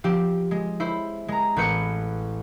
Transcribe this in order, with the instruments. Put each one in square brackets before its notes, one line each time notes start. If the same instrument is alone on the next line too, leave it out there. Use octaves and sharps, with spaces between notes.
[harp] F3 C4 G4
G#3
E4 C5
G#3 A#5
A1 C4 B4 G6 C#7